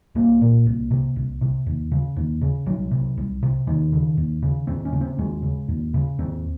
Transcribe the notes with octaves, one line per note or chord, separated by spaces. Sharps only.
C2 A#3
A#2
C2
C3
C2
C3
D#2
C#3
D#2
C#3
C2 F#3
C3
C2
C3
D#2 D#3
C#3
D#2
C#3
D#2 C4
C#4
C#3
C4
D#2 G#3
C#3
D#2
C#3
D#2 C4